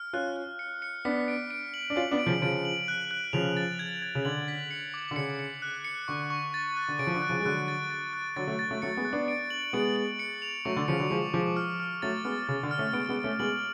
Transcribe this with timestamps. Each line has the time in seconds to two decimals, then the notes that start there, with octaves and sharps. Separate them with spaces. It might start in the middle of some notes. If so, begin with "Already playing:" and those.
Already playing: F6
0.13 C#4 F4 F#6
0.36 F#6
0.59 C#7
0.82 C#7
1.05 B3 D4 B6
1.28 D7
1.51 D7
1.74 F#7
1.90 D4
1.96 C#4 F4 F#7
2.11 B3 D4
2.19 D7
2.26 C#3 F3
2.42 C#3 F3 D7
2.65 F#7
2.88 F#6
3.11 F#6
3.33 C#3 F3 F7
3.57 A6
3.79 G#6
4.02 G#6
4.15 C#3
4.25 D3 F#7
4.48 B6
4.71 C#7
4.94 D6
5.11 D3
5.16 C#3 C#7
5.39 C#7
5.62 F#6
5.85 C#7
6.08 D3 C#6
6.30 C#6
6.54 A6
6.76 F#6
6.88 D3
6.99 C#3 D7
7.07 F3
7.15 D3
7.22 F#6
7.29 C#3 F3
7.40 G#3
7.45 D3 F#3 F#6
7.68 A6
7.90 A6
8.13 F#6
8.36 D3 F#3 A6
8.47 F#3 A3
8.59 A6
8.71 F#3 A3
8.82 F#3 A3 C#7
8.97 G#3 B3
9.05 F#6
9.13 B3 D4
9.28 D7
9.50 F#7
9.73 G#3 B3 D7
9.96 F#7
10.19 C#7
10.42 F7
10.65 F#3 A3 C#6
10.76 D3
10.88 C#3 F3 C#7
10.99 D3 F#3
11.10 F3 G#3 D6
11.34 F3 G#3 D6
11.56 F6
11.80 F6
12.02 F#3 A3 A6
12.25 G#3 B3 F6
12.48 C#3 F6
12.63 D3
12.71 F6
12.78 A3 C#4
12.93 G#3 B3 D7
13.09 G#3 B3
13.17 D7
13.24 A3 C#4
13.39 G#3 B3 F#7